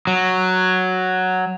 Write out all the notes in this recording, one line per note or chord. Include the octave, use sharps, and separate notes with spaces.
F#3